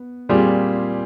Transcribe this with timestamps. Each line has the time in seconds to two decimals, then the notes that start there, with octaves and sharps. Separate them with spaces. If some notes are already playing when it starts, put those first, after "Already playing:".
Already playing: B3
0.29 A#2 G3 C4 F4 G#4